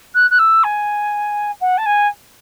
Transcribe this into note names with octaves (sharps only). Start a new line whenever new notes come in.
F#6
F#6
E6
G#5
F#5
A5
G#5